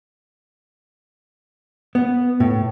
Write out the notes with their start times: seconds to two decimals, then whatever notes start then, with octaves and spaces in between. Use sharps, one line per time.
1.95 B3
2.40 A2